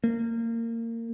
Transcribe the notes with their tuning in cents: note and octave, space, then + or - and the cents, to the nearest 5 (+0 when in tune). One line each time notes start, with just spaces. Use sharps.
A#3 -25